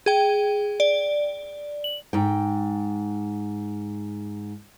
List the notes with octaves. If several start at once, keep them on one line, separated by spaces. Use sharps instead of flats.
G#4 G5
D5
F#7
G#2 G5